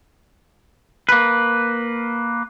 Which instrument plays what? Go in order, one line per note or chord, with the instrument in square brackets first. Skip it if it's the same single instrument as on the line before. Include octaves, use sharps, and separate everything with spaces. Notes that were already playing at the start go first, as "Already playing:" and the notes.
[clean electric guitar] A#3 B4